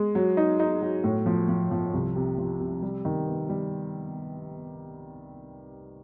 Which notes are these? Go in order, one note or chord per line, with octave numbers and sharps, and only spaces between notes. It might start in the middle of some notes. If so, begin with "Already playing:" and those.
Already playing: G#3
F#3
D#4
D#4
F#3
A2
F3
F3
F3
C2
C3
F3
C3
G3
D#3
B3
G3